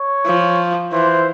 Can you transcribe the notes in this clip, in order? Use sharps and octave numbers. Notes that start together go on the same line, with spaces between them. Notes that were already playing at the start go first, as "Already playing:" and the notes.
Already playing: C#5
F3
E3 C5